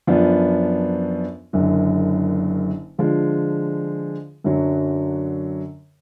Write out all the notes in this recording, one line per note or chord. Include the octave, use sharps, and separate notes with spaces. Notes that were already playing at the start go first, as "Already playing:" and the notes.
F#2 F3 B3 D4
F#1 F#2 D3
D3 F3 G#3
F#2 D3 F#3